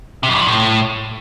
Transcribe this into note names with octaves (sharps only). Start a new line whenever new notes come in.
C3
F2
G2
F3
A2